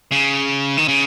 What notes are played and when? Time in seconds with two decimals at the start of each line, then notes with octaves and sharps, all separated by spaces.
0.12 C#3
0.78 D#3
0.88 C#3